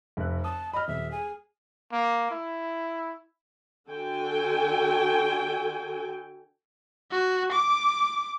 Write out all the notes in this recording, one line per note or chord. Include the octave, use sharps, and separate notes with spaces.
F1 F#6
A5 D#6
D#5 B5 F6
D#1 E5
G#4 G#5
A#3
E4
D3 F#4 A4 G5 G#5
F#4
D6